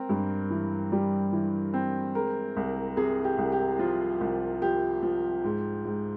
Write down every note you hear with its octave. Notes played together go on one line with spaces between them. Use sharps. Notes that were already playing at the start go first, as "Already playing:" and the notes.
Already playing: C4 A#4
G2
E3
G3
E3
C4
G#3 A#4
C2
C3 G#4
G4
C2
G4
F3 F4
C2
F3 G4
F3
G#2
G#2